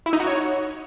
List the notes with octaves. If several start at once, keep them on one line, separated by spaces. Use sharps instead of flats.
E4
D#4
F#4
C#5